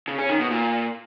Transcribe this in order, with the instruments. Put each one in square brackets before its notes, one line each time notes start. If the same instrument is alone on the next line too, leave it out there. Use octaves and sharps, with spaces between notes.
[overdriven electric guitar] C#3
C#4
D#3
B2
A#2